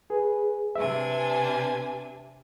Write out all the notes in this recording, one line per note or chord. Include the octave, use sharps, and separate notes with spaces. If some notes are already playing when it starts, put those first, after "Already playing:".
G#4 B4
C3 D4 B4 E5 G#5